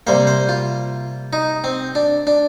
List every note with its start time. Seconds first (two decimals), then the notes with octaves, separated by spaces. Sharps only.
0.07 C3 G3 A#3 C5
0.27 C5
0.49 F4
1.33 D#4
1.64 C4
1.95 D4
2.27 D4